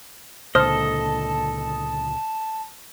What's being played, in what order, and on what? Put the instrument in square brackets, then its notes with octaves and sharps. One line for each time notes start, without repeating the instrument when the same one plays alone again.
[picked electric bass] C#2 A#2 D3 [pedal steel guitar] A4 D#5 [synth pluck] C5 F6 [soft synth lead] A5